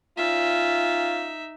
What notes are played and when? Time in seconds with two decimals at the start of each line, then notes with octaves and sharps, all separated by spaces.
0.18 C#4 D#4 F4 E5